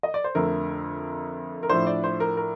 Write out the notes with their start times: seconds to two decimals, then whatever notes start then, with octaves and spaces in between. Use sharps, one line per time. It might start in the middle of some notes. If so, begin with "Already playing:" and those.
0.03 D#5
0.14 D5
0.24 C5
0.35 F2 D3 A3 A#4
1.63 A#4
1.70 A2 F3 A3 D4 C5
1.87 D5
2.04 C5
2.20 A#4
2.37 A#4